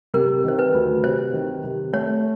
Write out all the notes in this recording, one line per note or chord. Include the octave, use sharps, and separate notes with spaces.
C3 A#4
D#3 C5
B4
D2
C3 C5
D#3
C3
A3 C#5